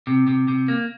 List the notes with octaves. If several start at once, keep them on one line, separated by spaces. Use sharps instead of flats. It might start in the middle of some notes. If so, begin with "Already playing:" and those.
C3
C3
C3
A#3